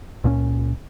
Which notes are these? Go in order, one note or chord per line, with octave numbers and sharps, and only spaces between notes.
C#2 A#2 F#3 C#4